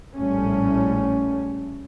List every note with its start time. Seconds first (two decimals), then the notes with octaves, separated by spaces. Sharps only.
0.15 A#1 A2 G3 A3 C#4